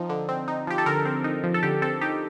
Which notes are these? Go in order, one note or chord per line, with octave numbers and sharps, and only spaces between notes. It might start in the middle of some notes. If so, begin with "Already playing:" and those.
Already playing: F3 C4 D#4
D3
C4
D#4
F3 G4
A4
D3 A#4
C4
D#4
F3
A4
D3 G4
C4 A4
D#4 G4